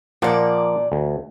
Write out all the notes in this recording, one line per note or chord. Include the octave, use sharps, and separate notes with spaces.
A#2 F3 A#3 D5 F#5
D2